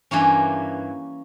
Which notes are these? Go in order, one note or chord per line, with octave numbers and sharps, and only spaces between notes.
G2 E3 A#3 C#4